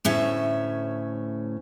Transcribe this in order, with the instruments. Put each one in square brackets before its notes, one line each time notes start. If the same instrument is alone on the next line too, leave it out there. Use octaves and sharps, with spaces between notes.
[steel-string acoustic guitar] D2 A2 C#4 E5